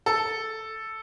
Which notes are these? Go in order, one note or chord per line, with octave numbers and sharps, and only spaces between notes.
A4